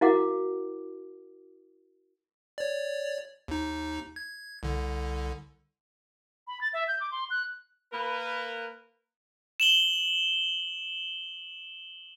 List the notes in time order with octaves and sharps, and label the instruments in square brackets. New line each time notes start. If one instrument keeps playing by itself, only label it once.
[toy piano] E4 F#4 A#4 F5 F#5 D6
[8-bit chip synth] C#5 D5
D#2 D#4
G#6
C2 D3
[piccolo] B5
A6
E5
G6
D6
C6
F#6
[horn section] A#3 A#4 B4
[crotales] E7 F#7 G7